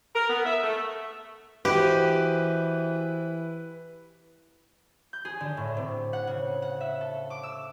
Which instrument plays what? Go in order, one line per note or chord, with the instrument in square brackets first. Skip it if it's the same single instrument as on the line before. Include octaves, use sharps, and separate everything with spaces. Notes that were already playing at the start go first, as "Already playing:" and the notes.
[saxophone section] A#4
B3
E5
A3
[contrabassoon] E3 [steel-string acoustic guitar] F#4 C5 D#5 [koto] G4 [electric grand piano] B4
[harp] G6
G#4
D3
A2
C3
F#5
C#3
F#5
E5
A4
D6
E6